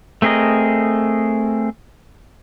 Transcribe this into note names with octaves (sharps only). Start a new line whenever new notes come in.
A3 C4 G#4 A#4 D#5